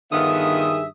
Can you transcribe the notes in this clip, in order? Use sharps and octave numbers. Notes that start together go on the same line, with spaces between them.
G2 D3 D#3 F3 B3 G#4 E5 D#6